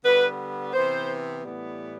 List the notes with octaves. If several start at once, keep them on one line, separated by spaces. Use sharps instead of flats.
D3 G3 B3 B4
C3 E3 B3 C5
A2 E3 G3 B3